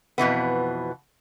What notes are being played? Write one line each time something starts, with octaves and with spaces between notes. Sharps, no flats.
F2 B2 E3 B3